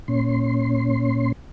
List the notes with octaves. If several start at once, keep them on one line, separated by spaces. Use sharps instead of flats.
A#2 C#4 C6